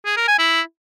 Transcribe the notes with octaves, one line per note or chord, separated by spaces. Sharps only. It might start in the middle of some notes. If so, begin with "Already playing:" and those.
G#4
A#4
G#5
E4